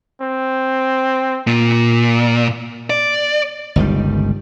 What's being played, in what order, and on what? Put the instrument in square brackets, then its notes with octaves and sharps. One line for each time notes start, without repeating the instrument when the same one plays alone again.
[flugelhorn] C4
[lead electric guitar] A#2
D5
[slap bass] G1 C#2 D#3 G3